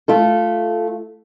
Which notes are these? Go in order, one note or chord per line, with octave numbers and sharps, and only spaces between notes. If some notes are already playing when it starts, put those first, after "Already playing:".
A3 F4 A4